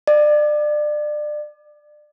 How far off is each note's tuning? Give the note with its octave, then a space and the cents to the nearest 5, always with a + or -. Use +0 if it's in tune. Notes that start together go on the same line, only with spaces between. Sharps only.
D5 +30